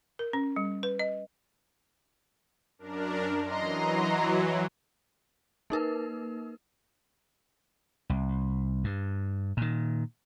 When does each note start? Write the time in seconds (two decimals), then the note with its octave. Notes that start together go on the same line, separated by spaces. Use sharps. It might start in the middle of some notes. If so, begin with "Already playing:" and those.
0.19 A#4
0.33 C#4
0.56 G3
0.83 B4
0.99 D#5
2.79 F#2 D4 A#4
3.49 E3 F#3 D#5 A#5 C6
5.70 A#3 D#4 A#4 B4
8.10 C2
8.84 G2
9.57 A#2 D#3